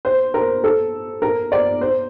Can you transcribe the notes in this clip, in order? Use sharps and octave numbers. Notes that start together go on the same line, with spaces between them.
C5
A#4
A4
A#4
D5
C5